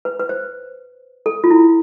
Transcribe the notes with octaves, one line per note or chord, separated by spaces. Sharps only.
B4
B4
C5
A4
F4
E4